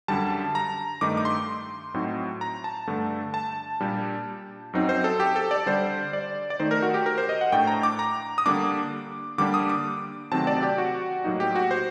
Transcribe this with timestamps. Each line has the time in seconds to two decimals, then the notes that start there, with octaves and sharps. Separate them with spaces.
0.08 F#2 D3 G3 A5
0.55 A#5
1.01 G2 D#3 A3 D#4 D6
1.17 D6
1.25 C6
1.94 A2 F#3 C4 D#4
2.41 A#5
2.64 A5
2.87 G2 D3 A3 D4
3.34 A5
3.81 A#2 G3 D4
4.73 F#2 F#3 C4 D#4
4.89 C5
5.04 A4
5.20 G4
5.36 A4
5.51 D5
5.66 D3 G3 D4 C5
6.13 D5
6.50 D5
6.60 D#3 A3 D#4 C5
6.71 A#4
6.82 F#4
6.94 G4
7.06 A#4
7.18 C5
7.29 D#5
7.41 F#5
7.52 A2 A3 D4 G5
7.67 A#5
7.83 D6
7.99 A#5
8.38 D#6
8.46 D3 G3 A#3 D4 D6
9.38 D3 G3 A#3 D4 D6
9.54 D#6
9.70 D6
10.31 C3 D#3 F#3 A3 C4 A5
10.47 D5
10.63 G4
10.78 F#4
11.24 A2 F#3 A#3 D#4
11.40 G4
11.55 F#4
11.71 C5